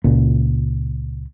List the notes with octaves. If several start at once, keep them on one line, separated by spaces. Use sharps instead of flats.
C#2 A#2